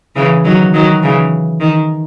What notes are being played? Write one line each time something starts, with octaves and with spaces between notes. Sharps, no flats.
C#3 E3
D#3 F#3
D#3 F#3
C#3 E3
D#3